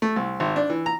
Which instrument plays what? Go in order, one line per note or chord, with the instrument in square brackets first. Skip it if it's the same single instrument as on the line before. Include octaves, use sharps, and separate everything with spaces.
[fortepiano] A3
C2
G#1
D4
E3
A#5